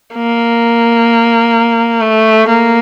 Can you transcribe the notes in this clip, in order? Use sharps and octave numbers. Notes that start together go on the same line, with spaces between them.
A#3
A3
A#3